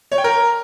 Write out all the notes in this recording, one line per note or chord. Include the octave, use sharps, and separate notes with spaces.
C#5
G5
A#4